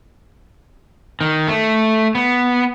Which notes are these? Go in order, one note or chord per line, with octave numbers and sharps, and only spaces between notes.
D#3
A3
B3